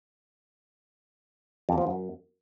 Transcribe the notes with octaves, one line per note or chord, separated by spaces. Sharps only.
F2
F3
F#2